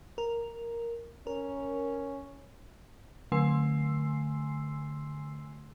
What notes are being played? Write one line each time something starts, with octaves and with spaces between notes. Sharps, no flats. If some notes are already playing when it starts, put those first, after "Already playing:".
A#4
C#4 A#4
D3 A3 G#5 C6 E6 C7